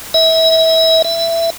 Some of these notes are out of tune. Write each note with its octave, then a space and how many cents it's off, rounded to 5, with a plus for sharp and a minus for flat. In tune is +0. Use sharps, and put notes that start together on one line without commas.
E5 -30
E5 +15